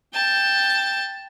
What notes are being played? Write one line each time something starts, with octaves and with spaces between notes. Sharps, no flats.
G5 A5